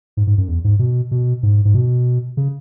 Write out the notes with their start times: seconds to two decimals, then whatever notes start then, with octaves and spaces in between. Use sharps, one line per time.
0.17 G#2
0.27 G#2
0.38 F#2
0.48 E2
0.64 G#2
0.79 B2
1.11 B2
1.43 G#2
1.65 G#2
1.74 B2
2.37 C#3